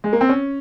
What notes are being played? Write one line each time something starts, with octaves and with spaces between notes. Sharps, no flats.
G#3
A#3
C4
C#4